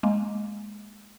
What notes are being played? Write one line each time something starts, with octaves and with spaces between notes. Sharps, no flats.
G#3 A#3